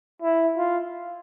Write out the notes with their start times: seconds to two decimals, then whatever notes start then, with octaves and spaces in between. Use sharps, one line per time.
0.23 E4
0.58 F4